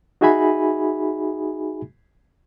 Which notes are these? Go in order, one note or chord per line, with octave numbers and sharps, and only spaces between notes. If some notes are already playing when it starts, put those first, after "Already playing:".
D#4 F#4 G#4 E5 G#5 B5